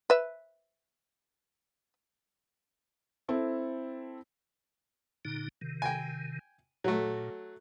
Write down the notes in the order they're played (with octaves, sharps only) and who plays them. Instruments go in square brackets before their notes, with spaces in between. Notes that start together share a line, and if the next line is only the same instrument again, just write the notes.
[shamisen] B4 E5
[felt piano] C4 E4 A4
[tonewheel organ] A#2 D3 D#4
C3 D#3
[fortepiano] G5 G#5
[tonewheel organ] A#2 [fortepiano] F#3 A3